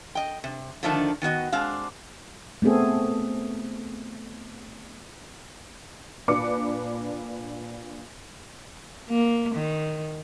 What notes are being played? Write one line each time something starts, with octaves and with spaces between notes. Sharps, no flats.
D#5 G5
C3
D3 D#3 F3 A3 D4 D#4
D#3 B3 F#4 D#5
G#3 C4 D4 F5
A3 B3 C4 G#4 A4
A#2 D4 B4 D6 C#7
A#3
D#3